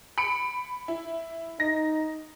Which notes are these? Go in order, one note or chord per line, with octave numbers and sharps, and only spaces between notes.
B5 C#7 D7
E4
D#4 A#6